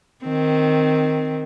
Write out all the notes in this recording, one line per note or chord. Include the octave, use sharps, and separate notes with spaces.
D#3 C4